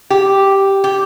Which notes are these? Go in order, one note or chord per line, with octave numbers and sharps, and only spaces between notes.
G4
G4